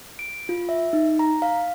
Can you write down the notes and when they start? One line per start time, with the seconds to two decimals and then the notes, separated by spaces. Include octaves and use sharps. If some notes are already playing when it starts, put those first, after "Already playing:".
0.19 D7
0.49 F4
0.69 E5
0.93 D#4
1.19 A#5
1.42 F5